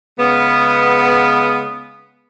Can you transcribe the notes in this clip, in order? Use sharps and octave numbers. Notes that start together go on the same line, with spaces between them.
C#3 G#3 B3